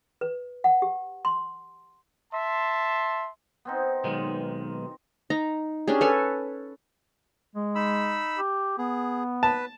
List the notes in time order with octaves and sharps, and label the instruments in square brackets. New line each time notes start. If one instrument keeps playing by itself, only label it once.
[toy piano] B4
F#5
G4
C6
[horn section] E5 A5 C6
[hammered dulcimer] B3 C4 D#4
[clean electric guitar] B1 D#3 G#3 [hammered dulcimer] D#4 F4
[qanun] D#4 A#5
C#4 D4 G4 G#4
A4 B4 C#5 G#5
[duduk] G#3
[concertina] D#4 B5 E6
[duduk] G4
[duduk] B3 [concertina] G#4
[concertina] B4 [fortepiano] A5